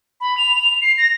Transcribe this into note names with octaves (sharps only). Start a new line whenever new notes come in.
B5
F7
F7
C7
A#6